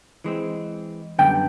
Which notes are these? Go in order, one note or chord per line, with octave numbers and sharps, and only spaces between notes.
E3 G#3 C4
F#2 D3 G3 B3 G5